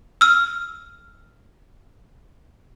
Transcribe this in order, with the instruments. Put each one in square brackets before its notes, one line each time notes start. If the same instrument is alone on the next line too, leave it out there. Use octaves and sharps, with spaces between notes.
[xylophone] E6 F6